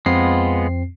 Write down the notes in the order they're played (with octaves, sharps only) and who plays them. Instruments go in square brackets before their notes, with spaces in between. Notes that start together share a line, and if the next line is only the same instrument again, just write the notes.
[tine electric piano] F2 C4 C7 [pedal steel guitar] G#3 B3 F4